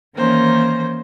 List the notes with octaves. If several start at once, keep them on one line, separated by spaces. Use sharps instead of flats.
D#3 E3 A#3 C#4 D#4 C5